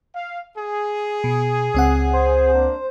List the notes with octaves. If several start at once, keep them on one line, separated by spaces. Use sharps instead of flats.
F5
G#4
B2
C#2 C4 F#5
C5
A#3 D4